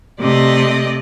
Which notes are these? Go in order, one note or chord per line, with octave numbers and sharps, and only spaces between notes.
C3 A3 D5 D#5